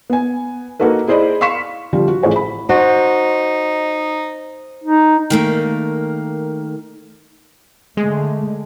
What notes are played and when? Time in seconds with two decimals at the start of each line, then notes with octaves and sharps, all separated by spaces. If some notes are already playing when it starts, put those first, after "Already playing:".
0.10 B3 G#5
0.80 A#3 D#4 F#4 A4 B4
1.08 E4 G#4 C5 D5 D#5 B5
1.41 F5 C6 C#6 B6 E7
1.93 D3 F3 G3 C4 F4
2.08 F#4
2.23 A1 E4 G#4 C#5 F#5
2.36 B5
2.69 D#4 F#4 C5
4.84 D#4
5.30 D#3 A3 A#3
7.97 D3 G#3 A3